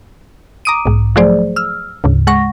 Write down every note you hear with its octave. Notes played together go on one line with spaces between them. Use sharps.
A#5 D6 D#6 D7 D#7
B1 G#2
F3 F#3 A3 G#4 C5 D5
E6 F6
D2 G#2 C#3
G#3 F#5 C#6 A#6